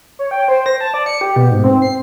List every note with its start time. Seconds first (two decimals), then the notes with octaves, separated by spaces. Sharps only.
0.19 C#5
0.31 G5
0.48 C5
0.66 A#6
0.81 A5
0.94 D5
1.06 C#7
1.21 G4
1.36 B2
1.51 G#2
1.64 C4
1.82 C7